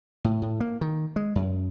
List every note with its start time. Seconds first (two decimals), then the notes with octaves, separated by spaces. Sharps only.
0.24 A2
0.42 A2
0.60 A#3
0.81 D#3
1.16 G#3
1.35 F#2